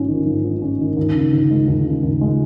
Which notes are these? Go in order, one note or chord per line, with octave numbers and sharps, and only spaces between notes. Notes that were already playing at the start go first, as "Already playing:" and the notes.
Already playing: G#1 G#2 C#4
D#3
G#1
G#2
C#4
D#3
D#2
C#3
D#2
G#3
D#2
C#3
D#2
G#3